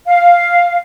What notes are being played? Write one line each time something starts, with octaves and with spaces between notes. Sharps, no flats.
F5